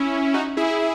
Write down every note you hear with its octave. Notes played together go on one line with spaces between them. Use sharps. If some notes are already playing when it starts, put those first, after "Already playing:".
Already playing: C#4 E4
D#4 F#4
E4 G#4